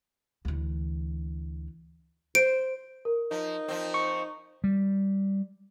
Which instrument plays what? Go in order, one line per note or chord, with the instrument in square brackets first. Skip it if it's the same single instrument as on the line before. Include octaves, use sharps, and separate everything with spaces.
[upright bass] D2 E3
[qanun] C5 [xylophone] D7
[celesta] A#4
[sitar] F3 [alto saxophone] D#4
[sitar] F3 C4
[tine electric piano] C#6
[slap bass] G3